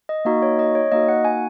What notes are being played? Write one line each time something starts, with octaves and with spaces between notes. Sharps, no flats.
D#5
A#3 D#4 F#4 D#5
C#5
D#5
C#5
A#3 D#4 F#4 D#5
F#5
G#5